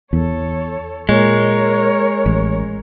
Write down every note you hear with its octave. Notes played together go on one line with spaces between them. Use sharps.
E2 A4 C#5
A#2 G#3 A#4 C#5
A1